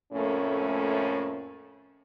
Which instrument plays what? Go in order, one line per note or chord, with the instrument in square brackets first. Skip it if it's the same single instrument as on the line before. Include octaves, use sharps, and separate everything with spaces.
[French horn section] F2 A2 A3 A#3 C#4